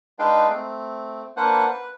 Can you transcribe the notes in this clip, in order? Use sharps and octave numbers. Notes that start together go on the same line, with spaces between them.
G#3 D4 D#4 B4 F5 G5
A3 C4
A#3 D4 B4 C5 F#5
B4